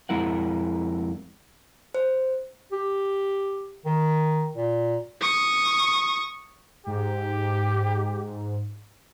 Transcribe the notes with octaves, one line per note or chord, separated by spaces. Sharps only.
F2 G#3 E4 A#4 F#5
C5
G4
D#3
A#2
C#6 D#6
G#2 G4